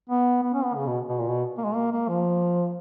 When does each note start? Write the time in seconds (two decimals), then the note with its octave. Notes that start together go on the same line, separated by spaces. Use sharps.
0.09 B3
0.43 B3
0.53 C#4
0.65 B3
0.75 C#3
0.87 B2
1.09 B2
1.19 A#2
1.30 B2
1.58 A#3
1.64 G#3
1.75 A#3
1.92 A#3
2.09 F3